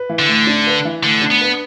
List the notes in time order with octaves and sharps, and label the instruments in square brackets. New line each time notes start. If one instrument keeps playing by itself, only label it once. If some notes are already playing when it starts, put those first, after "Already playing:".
Already playing: [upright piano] B4
E3
[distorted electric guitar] D3
[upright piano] A2
D4
B4
E3
[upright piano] A2 [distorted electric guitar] D3
[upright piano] D4
[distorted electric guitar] B3
[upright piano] B4